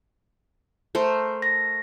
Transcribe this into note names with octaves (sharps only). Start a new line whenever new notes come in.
A3 A#4 C5
A#6